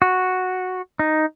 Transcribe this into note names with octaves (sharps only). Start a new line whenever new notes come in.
F#4
D#4